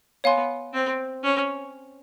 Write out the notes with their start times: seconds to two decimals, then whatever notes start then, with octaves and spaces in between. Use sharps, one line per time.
0.24 B3 C#5 F5 G#5 C6
0.73 C4
1.23 C#4